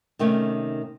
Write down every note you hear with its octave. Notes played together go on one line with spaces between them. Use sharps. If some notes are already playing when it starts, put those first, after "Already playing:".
C3 D#3 A3 A#3 C#4